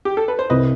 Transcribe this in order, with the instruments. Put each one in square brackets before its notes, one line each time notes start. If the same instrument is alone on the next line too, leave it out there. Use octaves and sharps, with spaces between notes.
[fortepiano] G4
A4
B4
C5
[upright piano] C2 [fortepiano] B4 D#5